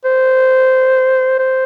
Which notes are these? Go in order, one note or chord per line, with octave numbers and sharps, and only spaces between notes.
C5
C5